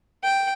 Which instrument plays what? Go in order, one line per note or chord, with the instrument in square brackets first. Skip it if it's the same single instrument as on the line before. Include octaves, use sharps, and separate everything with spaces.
[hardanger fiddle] G5